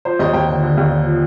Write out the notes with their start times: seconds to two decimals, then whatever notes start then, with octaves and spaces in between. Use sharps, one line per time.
0.05 F3 C5
0.19 D#2 D#5
0.33 D#2 G5
0.48 D3 G5
0.63 D3
0.77 D#2
0.91 D3
1.05 F3